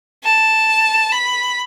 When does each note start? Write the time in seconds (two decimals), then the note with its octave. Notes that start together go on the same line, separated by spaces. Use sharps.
0.24 A5
1.12 B5